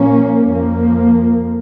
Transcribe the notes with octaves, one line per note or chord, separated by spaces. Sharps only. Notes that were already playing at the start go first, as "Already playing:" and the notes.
Already playing: A#2 F3 A#3 C#4
F2 F3 A#3